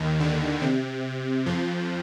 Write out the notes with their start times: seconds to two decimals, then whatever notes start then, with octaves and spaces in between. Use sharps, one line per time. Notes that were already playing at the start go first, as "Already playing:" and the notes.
Already playing: D#2 D#3
0.20 D3
0.62 C3
1.46 F2 F3